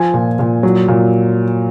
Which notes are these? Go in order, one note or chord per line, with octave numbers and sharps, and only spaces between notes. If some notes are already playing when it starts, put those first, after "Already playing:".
Already playing: F3 G#5
A#2
A#2
F#3
A#2